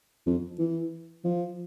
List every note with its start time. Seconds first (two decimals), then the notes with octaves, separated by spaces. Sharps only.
0.26 F2
0.59 E3
1.24 F3